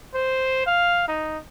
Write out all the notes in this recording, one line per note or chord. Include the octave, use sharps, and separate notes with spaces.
C5
F5
D#4